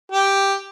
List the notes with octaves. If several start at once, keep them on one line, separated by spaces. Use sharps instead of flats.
G4